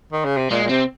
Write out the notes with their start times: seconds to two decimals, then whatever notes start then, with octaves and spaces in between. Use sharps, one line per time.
0.12 D#3
0.25 C#3
0.37 C3
0.51 A#2 G#3
0.64 A#2
0.69 C3 C4